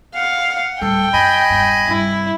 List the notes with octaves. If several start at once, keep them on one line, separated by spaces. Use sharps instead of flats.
F5 F#5
D1 G3 A4 G5
F#2 D#5 G#5 B5
E1 G2
G2 C3 E4